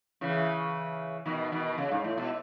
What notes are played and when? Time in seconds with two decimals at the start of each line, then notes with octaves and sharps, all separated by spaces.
0.21 C#3 E3
1.26 B2 D#3
1.52 B2 D#3
1.78 C#3
1.92 G#2
2.04 A2
2.18 B2